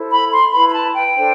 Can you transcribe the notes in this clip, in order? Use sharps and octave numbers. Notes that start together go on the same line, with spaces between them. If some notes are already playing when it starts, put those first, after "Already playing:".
Already playing: E4 A4 C5
B5
C6
E4 B4 B5
B5
A5
G5
D4 A4 C5